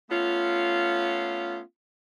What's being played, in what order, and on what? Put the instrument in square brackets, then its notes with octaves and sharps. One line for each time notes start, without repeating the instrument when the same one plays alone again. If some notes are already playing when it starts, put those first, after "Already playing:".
[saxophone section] A3 B3 C#4 F4